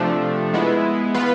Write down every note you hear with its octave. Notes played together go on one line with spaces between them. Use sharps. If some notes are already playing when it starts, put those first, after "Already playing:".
Already playing: C3 F3 A3 D4
G#3 B3 E4
E3 B3 F4 B4